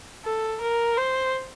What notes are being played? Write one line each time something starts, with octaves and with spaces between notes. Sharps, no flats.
A4
A#4
C5